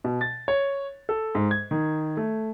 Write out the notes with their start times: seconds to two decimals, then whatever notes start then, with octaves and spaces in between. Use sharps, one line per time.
0.04 B2
0.21 A6
0.48 C#5
1.09 A4
1.35 G#2
1.51 G#6
1.71 D#3
2.17 A3